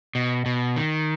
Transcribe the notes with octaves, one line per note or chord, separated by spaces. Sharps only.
B2
B2
D#3